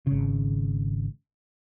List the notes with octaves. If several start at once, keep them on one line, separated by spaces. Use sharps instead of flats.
G#1 C#3